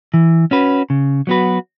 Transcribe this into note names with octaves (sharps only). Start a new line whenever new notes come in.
E3
C#4 F#4 B4
C#3
F#3 B3 F#4 B4